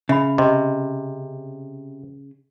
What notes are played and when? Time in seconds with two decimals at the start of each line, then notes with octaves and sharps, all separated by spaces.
0.09 C#3 E5 B5
0.38 C3 D#5